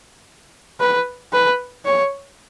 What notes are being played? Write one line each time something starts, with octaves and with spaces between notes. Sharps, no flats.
B4
B4
C#5